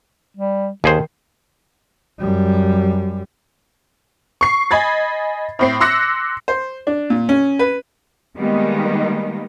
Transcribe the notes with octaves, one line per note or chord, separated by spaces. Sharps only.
G3
D#2 D#3 G#4 C5
F#2 G3
C#6 C7
D#5 G#5 B5 G#6 A6
A2 C4 C7
C6 D6 E6 F#6 A#6 C#7
C5
D4
A#2
C#4
B4
D#3 G3 G#3 A#3 B3 D#4